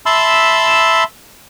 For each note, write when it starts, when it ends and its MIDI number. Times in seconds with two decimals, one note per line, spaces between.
0.06 1.04 76
0.06 1.04 81
0.06 1.04 83
0.06 1.04 84
0.06 1.04 88